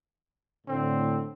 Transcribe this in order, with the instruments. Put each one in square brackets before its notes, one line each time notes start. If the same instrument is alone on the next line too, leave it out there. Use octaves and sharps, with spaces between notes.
[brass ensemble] A2 D3 [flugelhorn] C4